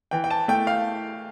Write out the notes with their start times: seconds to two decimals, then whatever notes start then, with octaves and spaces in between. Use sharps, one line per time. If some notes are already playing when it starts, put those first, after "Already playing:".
0.11 E3 G5
0.24 G5
0.30 A5
0.48 A3 G5
0.67 F5